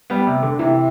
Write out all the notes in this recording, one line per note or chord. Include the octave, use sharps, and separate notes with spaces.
G3 B3
C3
D3
C3 E3